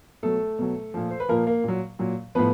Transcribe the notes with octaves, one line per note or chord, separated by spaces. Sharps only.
B2 F#3 A3 A4
B2 F#3
A#2 F3
C5
B4
A#2 F3 A#3 A#4
A#3 A#4
A#2 F#3
A#2 F#3
A2 F3 B3 B4